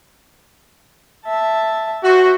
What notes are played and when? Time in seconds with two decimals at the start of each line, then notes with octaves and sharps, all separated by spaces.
1.25 E5 A5
2.03 F#4 C5 E5